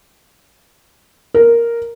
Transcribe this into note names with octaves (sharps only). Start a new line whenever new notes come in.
A#4